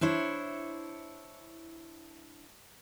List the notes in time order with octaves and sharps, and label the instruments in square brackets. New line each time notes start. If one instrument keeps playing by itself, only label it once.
[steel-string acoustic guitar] D4 E4 C5 C#5